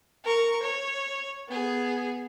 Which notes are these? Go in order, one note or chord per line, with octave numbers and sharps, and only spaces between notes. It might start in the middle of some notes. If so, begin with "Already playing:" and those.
A#4 C#6
C#5
B3 G#4